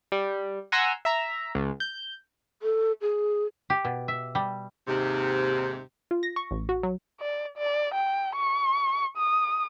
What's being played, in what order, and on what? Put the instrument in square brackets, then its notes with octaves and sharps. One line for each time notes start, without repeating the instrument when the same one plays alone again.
[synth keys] G3
F#5 G#5 A#5 C6 E6
E5 A#5
C#2
G6
[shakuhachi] A4
G#4
[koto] G4
B2
E5
G3
[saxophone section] D#2 G#2 C3
[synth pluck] F4
A#6
C#6
A1
F#4
F#3
[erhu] D5
D5
G5
C#6
D#6